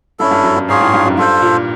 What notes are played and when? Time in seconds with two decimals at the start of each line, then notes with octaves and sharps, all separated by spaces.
0.19 G2 C#4 E4 A4
0.31 G2
0.43 F#2
0.56 G2
0.69 G#2 F4 G#4 C#5 F5
0.81 A2
0.94 G2
1.05 F#2
1.18 G2 F4 A4 C5
1.42 A#2